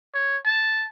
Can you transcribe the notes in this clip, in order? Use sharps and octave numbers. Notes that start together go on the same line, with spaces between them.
C#5
A5